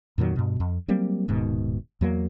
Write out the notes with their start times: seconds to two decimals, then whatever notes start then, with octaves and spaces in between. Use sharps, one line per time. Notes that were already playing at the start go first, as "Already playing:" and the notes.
0.18 F2 A#2 D#3 F#3
0.36 G2 B2
0.60 F2
0.88 F#3 G3 A#3 C4
1.28 D#1 G#2 B2 D#3
2.01 E2 F#3 A#3